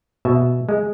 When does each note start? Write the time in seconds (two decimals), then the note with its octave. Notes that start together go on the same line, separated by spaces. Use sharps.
0.25 B2 E5
0.69 G#3